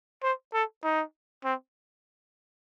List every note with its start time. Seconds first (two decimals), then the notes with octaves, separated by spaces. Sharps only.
0.23 C5
0.54 A4
0.84 D#4
1.44 C4